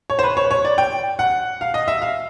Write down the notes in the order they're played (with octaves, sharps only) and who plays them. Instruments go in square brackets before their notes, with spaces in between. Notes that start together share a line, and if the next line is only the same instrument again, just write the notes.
[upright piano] C#5
C5
B4
C#5
C#5
D5
G5
F#5
F5
D#5
E5
F5